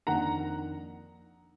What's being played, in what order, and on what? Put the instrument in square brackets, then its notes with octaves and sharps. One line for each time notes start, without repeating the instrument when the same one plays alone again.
[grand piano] F2 D#3 A#3 D4 [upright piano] F#5 A#5